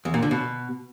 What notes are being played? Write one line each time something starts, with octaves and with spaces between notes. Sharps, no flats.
E2
A#2
D3
B2